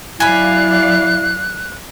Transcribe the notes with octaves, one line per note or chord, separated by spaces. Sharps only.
F#3 E4 D5 F5 G#5 B5 F#6